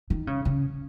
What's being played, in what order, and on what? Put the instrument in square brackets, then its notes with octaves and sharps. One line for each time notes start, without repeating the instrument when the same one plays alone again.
[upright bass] D#3
C#3
C#3